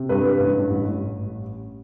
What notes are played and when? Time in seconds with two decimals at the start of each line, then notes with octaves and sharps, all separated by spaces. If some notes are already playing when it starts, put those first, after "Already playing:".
Already playing: C3
0.09 G2 B4
0.39 A1
0.70 A1